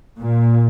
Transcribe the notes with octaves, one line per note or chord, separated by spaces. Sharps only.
A#2